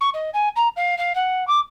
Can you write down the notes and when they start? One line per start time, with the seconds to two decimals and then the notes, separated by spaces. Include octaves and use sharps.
0.01 C#6
0.14 D#5
0.34 G#5
0.56 A#5
0.77 F5
0.98 F5
1.15 F#5
1.48 D6